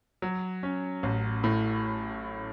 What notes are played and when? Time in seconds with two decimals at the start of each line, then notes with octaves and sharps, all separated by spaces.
0.22 F#3
0.63 C#4
1.03 A1
1.44 A2